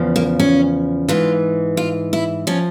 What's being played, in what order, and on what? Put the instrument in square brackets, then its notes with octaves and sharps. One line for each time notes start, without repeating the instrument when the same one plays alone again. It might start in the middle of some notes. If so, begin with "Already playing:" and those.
Already playing: [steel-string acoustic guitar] E2 C#3 F3
A#3
C#4
G#2 E3 F4
F4
E4
F3 C#4